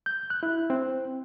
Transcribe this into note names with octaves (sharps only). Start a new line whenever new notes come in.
G6
F#6
E4
C4